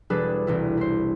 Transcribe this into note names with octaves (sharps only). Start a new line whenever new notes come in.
E1 G3 D4 G#4 A4 B4
E1 C2 E4
E4 C5